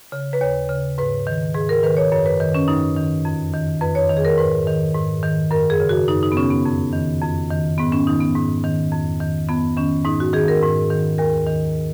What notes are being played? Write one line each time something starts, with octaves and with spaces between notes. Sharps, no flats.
C#3
B4
D#2 C#5
C#3
G#2 B4
D#3
G#2 G#4
A#4
D#3 B4
C#5
F#2 C#5
B4
D#3
C#4
F#2 D#4
D#3
F2
D#3
F2 B4
C#5
D#3
G#4
A#4
G#2 B4
D#3
G#2
D#3
F#2 A#4
G#4
C#3
F#4
F#2 D#4
D#4
B3
C#3 C#4
B3
F2
D#3
F2
D#3
G#2 B3
C#4
D#3 D#4
B3
G#2
D#3
F2
D#3
F2 B3
D#3 C#4
G#2 D#4
F#4
D#3 G#4
A#4
G#2
D#3
D#2 A#4
D#3